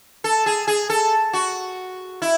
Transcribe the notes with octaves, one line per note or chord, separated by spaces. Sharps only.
A4
G#4
G#4
A4
F#4
E4